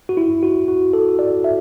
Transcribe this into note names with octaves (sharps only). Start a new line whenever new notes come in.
F#4
E4
F#4
F#4
A4
D5
E5